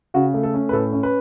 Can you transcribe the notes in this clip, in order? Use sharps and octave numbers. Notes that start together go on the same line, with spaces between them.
C#3 F#4
A3
A4
C#4
B4
A2 A4
C#4
B4